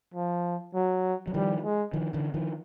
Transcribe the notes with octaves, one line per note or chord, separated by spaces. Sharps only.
F3
F#3
F#3
D#3 F3 G3
G#3
D#3 F3
D3 E3
D#3 F3